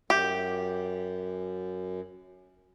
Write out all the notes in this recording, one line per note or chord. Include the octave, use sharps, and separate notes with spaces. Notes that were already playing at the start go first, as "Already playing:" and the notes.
F#2 G4 E5 D6 G6